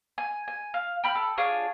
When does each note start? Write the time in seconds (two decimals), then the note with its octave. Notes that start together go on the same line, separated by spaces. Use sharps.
0.18 G#5
0.48 G#5
0.74 F5
1.04 G5 B5 F6
1.15 A4
1.38 D4 F4 G#4 C#5